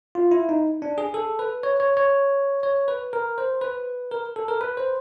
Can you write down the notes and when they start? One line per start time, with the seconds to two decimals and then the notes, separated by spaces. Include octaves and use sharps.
0.15 F4
0.31 E4
0.49 D#4
0.82 D4
0.98 G#4
1.14 A4
1.39 B4
1.63 C#5
1.80 C#5
1.97 C#5
2.63 C#5
2.88 B4
3.13 A#4
3.38 C5
3.61 B4
4.11 A#4
4.36 A4
4.48 A#4
4.61 B4
4.77 C5